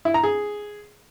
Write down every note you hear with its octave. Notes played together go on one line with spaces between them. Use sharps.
E4
A#5
G#4